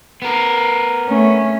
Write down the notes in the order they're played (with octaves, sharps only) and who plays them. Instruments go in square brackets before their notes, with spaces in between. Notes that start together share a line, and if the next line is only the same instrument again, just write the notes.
[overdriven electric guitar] B3 A#4
[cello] A3 C#4